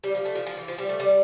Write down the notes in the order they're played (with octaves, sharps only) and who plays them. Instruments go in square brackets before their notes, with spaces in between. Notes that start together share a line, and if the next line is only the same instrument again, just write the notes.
[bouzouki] G3
F3
A3
F3
F3
E3
F3
G3
A3
G3